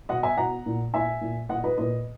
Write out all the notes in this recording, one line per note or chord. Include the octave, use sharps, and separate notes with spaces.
B2 D#5 F#5
E5 G#5
B2 F#5 A#5
A#2
A#2 E5 G#5
A#2
A#2 D#5 F#5
B4 D#5
A#2 B4 D#5